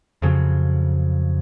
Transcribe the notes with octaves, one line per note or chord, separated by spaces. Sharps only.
F2 C#3 F#3